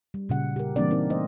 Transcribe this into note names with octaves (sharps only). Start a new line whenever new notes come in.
G3
A#2 C#3 F#5
G4 A#4
E3 G3 A#3 C4 D4 D5
C4 D#4 A#4
A3 C5 D#5